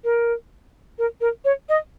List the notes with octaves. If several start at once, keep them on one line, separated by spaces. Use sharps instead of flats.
A#4
A#4
A#4
C#5
D#5